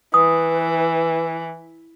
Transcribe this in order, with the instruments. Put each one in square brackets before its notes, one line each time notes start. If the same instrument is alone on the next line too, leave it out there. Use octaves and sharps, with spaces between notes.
[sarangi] E3 [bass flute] B4 [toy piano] D#6